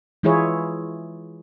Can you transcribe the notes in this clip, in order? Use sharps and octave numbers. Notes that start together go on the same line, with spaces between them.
E3 G#3 E4 F4 G#4 C#5